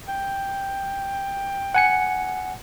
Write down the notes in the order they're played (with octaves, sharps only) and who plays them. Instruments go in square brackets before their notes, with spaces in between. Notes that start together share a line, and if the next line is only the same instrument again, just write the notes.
[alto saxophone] G5
[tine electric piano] F#5 G#5 C#7